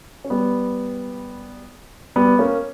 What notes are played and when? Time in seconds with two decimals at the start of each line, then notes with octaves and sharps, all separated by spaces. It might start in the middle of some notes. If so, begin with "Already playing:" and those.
0.24 C#4
0.30 G3 B3
2.16 G3 B3
2.39 A#3 C#4